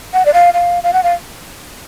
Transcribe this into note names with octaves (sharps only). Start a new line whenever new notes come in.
F#5
D5
F5
F5
F5
F#5
F5